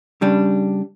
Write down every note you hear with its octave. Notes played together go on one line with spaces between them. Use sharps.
C#3 G3 D4